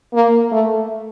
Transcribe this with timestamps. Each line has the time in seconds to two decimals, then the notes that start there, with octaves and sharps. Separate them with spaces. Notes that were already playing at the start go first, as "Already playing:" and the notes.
0.14 A#3
0.52 A3